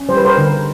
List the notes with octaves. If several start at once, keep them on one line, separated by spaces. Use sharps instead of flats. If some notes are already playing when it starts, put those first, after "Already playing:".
Already playing: C#4
G3 C5
B4
A#4 C5
D3